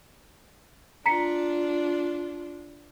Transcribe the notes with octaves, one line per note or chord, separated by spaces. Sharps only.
D4 F4 A#5 B6 C#7